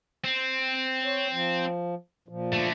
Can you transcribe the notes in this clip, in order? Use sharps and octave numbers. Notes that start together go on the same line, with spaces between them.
C4
C#5
F3
A#2 F3
D3 A3